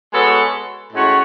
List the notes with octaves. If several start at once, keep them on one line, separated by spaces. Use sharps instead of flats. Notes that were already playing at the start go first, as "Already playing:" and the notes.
G#3 B3 F#4 A4 C#5
A2 G#3 C#4 F#4 C#5